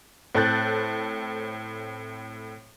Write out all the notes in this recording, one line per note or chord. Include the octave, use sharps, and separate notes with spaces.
A2 C4 A4 F#6 G6 A6